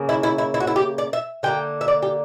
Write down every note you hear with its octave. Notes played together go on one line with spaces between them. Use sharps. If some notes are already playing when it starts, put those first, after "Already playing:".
Already playing: C#3 A#3
E4
E4
E4
E4
F#4
E4
G4
D5
E5
D3 G3 A#3 G5
E5
D5
G4